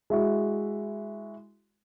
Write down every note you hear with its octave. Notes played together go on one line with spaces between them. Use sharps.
G#3 E4 F#4